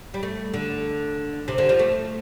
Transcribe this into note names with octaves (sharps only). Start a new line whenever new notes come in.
G3
A3
D3
C3
D3
F3
A3